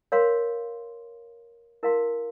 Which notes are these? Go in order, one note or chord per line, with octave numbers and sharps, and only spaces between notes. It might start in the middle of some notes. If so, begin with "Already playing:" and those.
A#4 C#5 F5 C6
E4 A#4 F5 C6